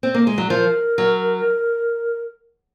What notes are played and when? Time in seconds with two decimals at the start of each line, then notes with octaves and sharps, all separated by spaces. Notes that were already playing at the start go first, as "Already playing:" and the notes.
0.03 C4
0.14 A#3
0.27 G#3
0.38 F#3
0.49 F3 A#4
0.98 F#3